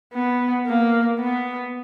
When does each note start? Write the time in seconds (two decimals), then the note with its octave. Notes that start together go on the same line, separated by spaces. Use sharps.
0.14 B3
0.66 A#3
1.19 B3